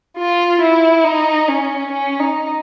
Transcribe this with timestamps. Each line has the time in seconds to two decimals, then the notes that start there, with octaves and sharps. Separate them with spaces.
0.18 F4
0.61 E4
1.05 D#4
1.48 C#4
1.91 C#4
2.20 D#4